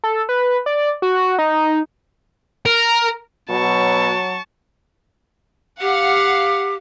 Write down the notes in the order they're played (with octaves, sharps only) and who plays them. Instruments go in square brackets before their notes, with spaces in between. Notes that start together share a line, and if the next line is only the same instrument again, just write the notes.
[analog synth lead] A4
B4
D5
F#4
D#4
[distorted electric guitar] A#4
[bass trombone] B2 [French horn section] F#3 [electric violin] A5 C#6
[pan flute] G4 [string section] F5 F#5